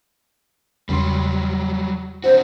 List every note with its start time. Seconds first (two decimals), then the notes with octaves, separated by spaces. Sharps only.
0.89 E2 C#3 F#3 G3 C6
2.24 C4 D4 F#4 C5